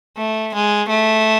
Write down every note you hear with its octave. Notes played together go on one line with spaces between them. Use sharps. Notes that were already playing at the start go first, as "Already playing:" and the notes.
A3
G#3
A3